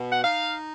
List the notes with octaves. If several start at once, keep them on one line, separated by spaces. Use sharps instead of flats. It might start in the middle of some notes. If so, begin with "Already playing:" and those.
Already playing: B2
F#5
D#4 F5